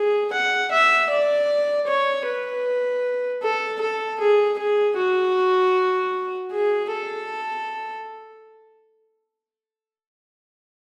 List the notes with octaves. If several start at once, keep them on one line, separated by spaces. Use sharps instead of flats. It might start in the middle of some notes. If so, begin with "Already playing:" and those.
Already playing: G#4
F#5
E5
D5
C#5
B4
A4
A4
G#4
G#4
F#4
G#4
A4